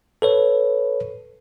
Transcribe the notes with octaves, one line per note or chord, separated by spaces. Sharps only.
A4 B4 C#5